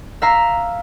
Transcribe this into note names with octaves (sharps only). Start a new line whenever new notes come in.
E5 F5 A#5